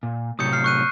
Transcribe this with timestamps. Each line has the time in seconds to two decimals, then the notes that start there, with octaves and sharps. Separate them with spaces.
0.03 A#2
0.39 A2 C3 F#3 D#6 G6 C#7
0.53 F6 C7
0.64 C#6 F#6 D#7